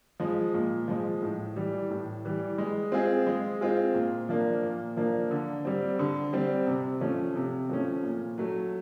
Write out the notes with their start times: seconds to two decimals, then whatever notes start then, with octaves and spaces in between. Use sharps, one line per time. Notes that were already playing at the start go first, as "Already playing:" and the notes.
0.20 F3 G#3
0.54 A#2
0.88 F3 G#3
1.22 A2
1.56 E3 G3
1.90 A2
2.25 E3 G3
2.58 G#3
2.92 C4 F4 G#4
3.27 G#3
3.61 C4 F4 G#4
3.95 A#2
4.29 F3 A#3 D4
4.63 A#2
4.97 F3 A#3 D4
5.31 D3
5.65 G3 C4
5.99 D3
6.33 G3 C4
6.67 C3
7.01 F3 A3 C#4
7.36 C3
7.69 F3 A3 C#4
8.03 A#2
8.38 F#3 A3